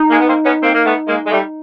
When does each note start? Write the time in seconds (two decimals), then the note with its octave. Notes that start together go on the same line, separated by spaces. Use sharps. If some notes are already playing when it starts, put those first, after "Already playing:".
Already playing: D#4
0.10 G#3 A#3
0.20 B3
0.28 A#3 C4
0.45 B3 C#4
0.62 A#3 C4
0.74 A#3
0.85 A3 B3
1.08 G#3 A#3
1.26 G#3
1.31 G3 A3